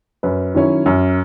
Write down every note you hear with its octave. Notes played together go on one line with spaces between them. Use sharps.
F#2 B4
D#3 F#3 C#4 E4
F#2